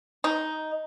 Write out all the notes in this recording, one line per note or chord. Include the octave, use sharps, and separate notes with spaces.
D#4